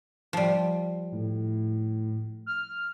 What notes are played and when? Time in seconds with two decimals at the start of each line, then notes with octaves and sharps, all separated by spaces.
0.33 F3 G3
1.12 A2
2.46 F6